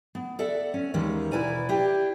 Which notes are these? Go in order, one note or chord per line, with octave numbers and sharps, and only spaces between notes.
B3
A4 D5 E5 F#5
C#4
D#2 D#3 E3 G#3 C#4
B2 E4 B4 D5 G#5 A#5
D4 E4 G4